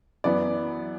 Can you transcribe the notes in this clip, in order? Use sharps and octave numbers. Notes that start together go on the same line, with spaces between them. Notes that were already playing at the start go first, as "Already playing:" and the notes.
F#2 E3 B3 D5